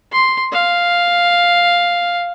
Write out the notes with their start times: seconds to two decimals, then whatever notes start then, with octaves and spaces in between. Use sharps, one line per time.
0.12 C6
0.52 F5